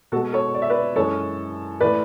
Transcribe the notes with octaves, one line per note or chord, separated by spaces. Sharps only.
B2 G#3 F#4 A4
A4 C#5
D5
E5
B4 D5
F#2 E3 G#3 A4 C#5
A2 E3 A3 B4 D5